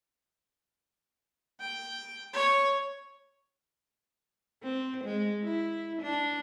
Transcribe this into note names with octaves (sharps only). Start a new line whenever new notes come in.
G5
C#5
C4
G#3
E4
D4